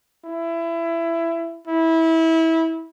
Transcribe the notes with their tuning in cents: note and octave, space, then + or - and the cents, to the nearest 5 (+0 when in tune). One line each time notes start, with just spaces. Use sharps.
E4 +20
E4 -20